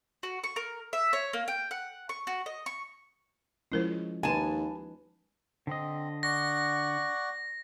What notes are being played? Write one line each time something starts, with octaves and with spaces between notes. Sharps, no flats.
F#4
C#6
A#4
E5
C#5
A#3
G5
F#5
C#6
F#4
D#5
C#6
F3 G#3 C#4 E4 A#4 C5
D#2 D#4 B4 G#5 A5
D3 C4 D#5
D5 F#5 C#6 A#6